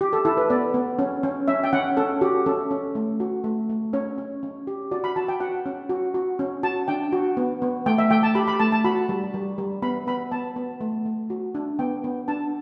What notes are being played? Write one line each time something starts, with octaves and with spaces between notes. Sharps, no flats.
G4
A4
E4 A4
B4
B3 D5
B3
C#4
C#4
C#4 E5
G5
C#4 F#5
C#4 A4
F#4 G4
C#4 A4
C#4
A3
F#4
A3
A3
C#4 C#5
C#4
C#4
G4
F#4 D5
B5
F#4 A5
G5
F#4 F#5
C#4
F#4
F#4
C#4
F#4 A5
D4 G5
F#4
B3
B3
A3 G5
E5
A3 G5
A5
G4 B5
B5
A3 A5
A5
F#4 B5
G3
G3
G3
B3 B5
B3 B5
B3 A5
B3
A3
A3
F#4
D4
B3 G5
B3
D4 A5